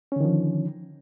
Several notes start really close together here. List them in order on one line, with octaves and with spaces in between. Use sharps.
C#4 D3 D#3 F3